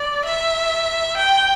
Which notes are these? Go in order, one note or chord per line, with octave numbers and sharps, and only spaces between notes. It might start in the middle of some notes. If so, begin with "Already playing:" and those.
Already playing: D5
E5
G5